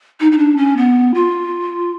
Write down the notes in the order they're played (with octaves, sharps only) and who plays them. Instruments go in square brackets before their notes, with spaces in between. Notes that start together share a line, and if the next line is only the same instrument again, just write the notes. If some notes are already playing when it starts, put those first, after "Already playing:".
[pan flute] D#4
D#4
D4
C#4
B3
F4